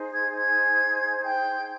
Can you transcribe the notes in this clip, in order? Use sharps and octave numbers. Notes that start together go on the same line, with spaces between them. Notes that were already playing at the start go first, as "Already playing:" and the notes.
Already playing: D#4 G#4 C5
G#6
G#5 G#6
G5 G6